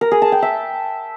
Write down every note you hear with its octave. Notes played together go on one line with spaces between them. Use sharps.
A#4
G#4
A5
G5
E5